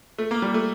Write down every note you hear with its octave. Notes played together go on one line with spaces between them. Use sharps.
A3
A#3
G3
A3